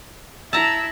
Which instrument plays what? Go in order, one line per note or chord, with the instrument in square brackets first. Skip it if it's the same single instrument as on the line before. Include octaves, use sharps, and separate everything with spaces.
[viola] E4 [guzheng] A5 A#5 [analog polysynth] E6